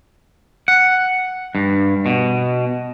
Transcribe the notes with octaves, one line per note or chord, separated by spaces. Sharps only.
F#5
G2
B2